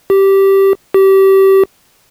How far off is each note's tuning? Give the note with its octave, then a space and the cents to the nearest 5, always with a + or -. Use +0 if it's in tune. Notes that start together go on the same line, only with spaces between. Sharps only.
G4 -10
G4 -25